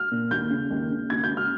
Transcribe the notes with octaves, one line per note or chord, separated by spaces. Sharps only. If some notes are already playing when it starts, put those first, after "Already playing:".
Already playing: F6
A#2
D#2 G6
C#3
D#2
C#3
D#2 G#6
G6
C#3
F6